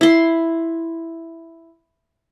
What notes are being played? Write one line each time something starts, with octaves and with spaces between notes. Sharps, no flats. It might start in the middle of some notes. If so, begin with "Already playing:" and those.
E4 C6